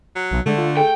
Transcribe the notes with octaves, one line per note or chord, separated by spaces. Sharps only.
F#3
B1
D3 G#3 A3
F4
G#4 A4 G5